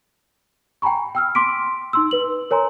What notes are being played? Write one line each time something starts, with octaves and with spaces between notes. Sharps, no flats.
G5 G#5 A#5 B5 C#6
G5 E6 F6
C6 D6 B6 D7
D#4 C6 E6
B4 F#7
A#4 C#5 G#5 A#5 C6